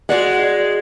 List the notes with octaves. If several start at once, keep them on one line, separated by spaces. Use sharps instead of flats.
G#3 F#4 D5 F#5
F#4